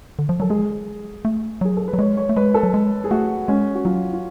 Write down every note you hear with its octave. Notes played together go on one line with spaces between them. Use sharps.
D3
F3
F#3 A4
G#3 G#4
A3
F#3 G#4
A4
B4
F#3
G#3 C#5
C#5
A3
G#3 B4
A4
F#3
G#3
G#4
A3 F#4
G#3 C#4
F#4
F#3 F4
F4